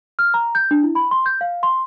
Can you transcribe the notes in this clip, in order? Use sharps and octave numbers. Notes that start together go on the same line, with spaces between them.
F6
A#5
G6
D4
E4
B5
C6
G6
F5
C6